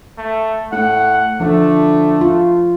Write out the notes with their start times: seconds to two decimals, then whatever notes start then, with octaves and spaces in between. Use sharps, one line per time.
0.18 A3
0.72 A2 F#5
1.40 D3 F3 A3
2.21 F4